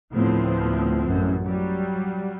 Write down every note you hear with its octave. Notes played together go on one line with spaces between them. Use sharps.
D2 A2 F3 B3 C4
A1 F#2
F#3 G3